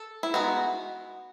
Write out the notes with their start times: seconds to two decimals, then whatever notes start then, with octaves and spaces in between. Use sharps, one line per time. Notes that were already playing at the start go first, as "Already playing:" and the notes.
Already playing: A4
0.23 E4
0.34 G#3 B3 D#4 F#4